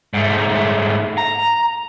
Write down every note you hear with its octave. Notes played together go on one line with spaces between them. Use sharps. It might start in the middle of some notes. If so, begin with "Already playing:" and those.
G#2 A3
A#5